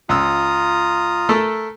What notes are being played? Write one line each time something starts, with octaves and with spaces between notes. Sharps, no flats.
C#2 F4 A#5 D#6 E6
A3 A4 A#4